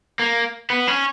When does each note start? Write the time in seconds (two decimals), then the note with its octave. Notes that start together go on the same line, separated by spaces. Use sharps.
0.20 A#3
0.70 B3
0.87 C#4